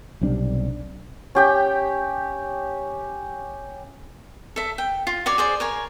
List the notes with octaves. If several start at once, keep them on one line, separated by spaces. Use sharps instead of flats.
B1 C3 G3 D4
C#4 G4 G5
A4 E5
G5
F4
F#4 C#5 D5
G#4 C5 D5
A#4 C#5 G#5